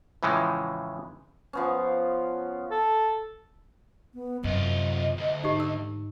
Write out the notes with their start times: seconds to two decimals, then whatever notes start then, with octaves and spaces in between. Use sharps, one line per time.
0.23 A2 C#3 E3 F3 G#3
1.53 F3 B3 C#4
2.71 A4
4.14 B3
4.44 C2 F#2 F4 D#5
5.17 D2
5.44 G#2 D#4 G4
5.60 E6